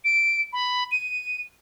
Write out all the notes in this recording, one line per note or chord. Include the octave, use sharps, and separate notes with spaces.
D7
B5
D#7